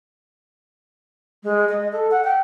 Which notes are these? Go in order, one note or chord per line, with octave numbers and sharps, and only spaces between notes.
G#3
D#5
A4
F#5
G5